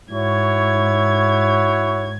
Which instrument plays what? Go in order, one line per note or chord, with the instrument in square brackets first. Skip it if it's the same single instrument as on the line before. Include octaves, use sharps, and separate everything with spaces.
[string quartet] G#2 G#6 [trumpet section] E4 F#4 C#5